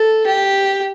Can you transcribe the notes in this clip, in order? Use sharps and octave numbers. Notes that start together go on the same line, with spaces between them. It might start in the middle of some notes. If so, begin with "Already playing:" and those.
Already playing: A4
G4